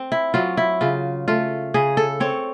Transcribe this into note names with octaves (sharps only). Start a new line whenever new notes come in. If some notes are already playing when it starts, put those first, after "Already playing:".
Already playing: C4
E4
F#3 F4
E4
C#3 F4
A3 F4
C#3 G#4
A4
C4 C#5